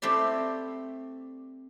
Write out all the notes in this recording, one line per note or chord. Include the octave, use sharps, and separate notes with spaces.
A3 C4 E4 G4 D5